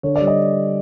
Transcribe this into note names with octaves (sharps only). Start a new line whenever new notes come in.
D3 C#5
D5
G3
D#5